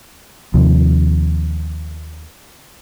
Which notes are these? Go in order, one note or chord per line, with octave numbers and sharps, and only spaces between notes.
D#2 C3 F3